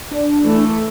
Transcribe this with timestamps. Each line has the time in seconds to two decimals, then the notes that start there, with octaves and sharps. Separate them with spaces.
0.11 D4
0.43 E3 A3 A4